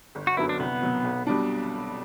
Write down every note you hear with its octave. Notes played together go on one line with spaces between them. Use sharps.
G1
F#4
F#2 D3 F#3 B3 E4
D4
C2 B3
B2 F#3
B1
B2 G3 D4